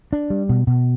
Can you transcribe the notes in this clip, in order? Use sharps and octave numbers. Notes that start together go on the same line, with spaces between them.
D4
G3
B2
B2